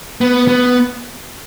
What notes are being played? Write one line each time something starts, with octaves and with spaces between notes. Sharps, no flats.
B3
B3